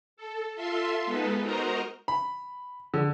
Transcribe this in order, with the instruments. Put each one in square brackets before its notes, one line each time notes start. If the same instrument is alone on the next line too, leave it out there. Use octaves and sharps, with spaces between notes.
[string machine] A4
F4 A4 E5 C6
G#3 B3 D#4 A4 B4
F#4 A#4 C5 D#5 A#5
[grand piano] B5
D3